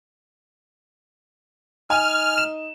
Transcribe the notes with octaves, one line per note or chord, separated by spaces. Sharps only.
D#4 G#5 F6 D#7
E7